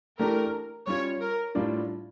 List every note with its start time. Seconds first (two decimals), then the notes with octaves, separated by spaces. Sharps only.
0.19 E3 A3 D4 G4 A#4
0.87 G3 C#4 F4 C#5
1.21 A#4
1.55 A2 G3 D4 F4